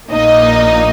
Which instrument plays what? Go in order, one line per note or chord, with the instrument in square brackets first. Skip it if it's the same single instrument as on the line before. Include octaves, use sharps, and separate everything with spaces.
[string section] A#1 A#2 A#3 D#4 D#5